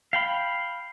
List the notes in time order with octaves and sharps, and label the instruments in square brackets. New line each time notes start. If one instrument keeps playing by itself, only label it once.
[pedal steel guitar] F5 G5 B5